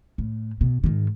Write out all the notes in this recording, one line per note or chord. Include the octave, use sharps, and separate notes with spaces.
A2
B2
G#2 D#3